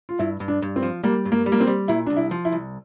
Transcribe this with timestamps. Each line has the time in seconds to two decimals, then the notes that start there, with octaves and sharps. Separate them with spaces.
0.09 F4
0.19 G2 E4
0.40 G2
0.48 D4
0.62 G2
0.76 C4
0.82 F3
1.03 G3 A#3
1.25 G2
1.32 A#3
1.46 G3
1.52 A#3
1.60 C4
1.67 G3
1.88 A#2 E4
2.06 C2 D4
2.17 E4
2.31 F3
2.45 E4
2.52 C2